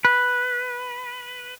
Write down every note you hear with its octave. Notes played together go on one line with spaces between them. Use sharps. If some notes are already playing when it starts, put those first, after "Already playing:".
B4